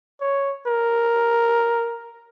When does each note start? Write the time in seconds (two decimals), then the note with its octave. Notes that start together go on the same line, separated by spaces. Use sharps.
0.21 C#5
0.67 A#4